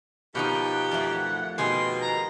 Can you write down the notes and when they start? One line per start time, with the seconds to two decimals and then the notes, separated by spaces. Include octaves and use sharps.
0.35 B2 D#3 F3 D#4 G4
0.73 F#5
0.91 F2 A3
1.58 B2 D#3 G4 G#4 C6
2.01 A#5